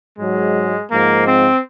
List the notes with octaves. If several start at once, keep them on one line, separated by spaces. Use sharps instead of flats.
G#2 F#3 G#3
G#2 F3 A#3
C4